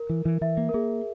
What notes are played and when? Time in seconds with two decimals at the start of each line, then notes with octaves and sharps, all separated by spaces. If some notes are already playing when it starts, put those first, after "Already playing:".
Already playing: A#4
0.09 E3
0.25 E3
0.41 E3 E5
0.57 A#3
0.69 A#4
0.74 A#3 G#4